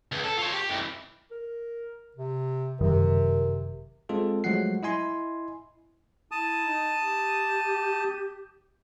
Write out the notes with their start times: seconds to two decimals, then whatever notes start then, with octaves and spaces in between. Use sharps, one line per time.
0.12 C#2
0.24 A4
0.38 F4 C#5
0.54 G4
0.70 F2 E3
1.31 A#4
2.17 C3
2.81 G1 F#2 C3 D#3 A#4
4.09 G#3 C4 F4 A4
4.44 F3 F#3 G#3 A3 F#5 C7
4.83 E4 D#5 G#5 C6
6.31 E4 A5 D#6
6.64 D#4
7.00 G4